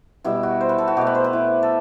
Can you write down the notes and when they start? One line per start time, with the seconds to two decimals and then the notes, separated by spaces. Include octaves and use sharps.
0.24 B2 G3 E4
0.43 F#4
0.61 C5
0.69 B4
0.78 A4
0.88 F#4
0.97 B2 A3 G4
1.07 B4
1.15 C5
1.24 B4
1.33 E4
1.63 A4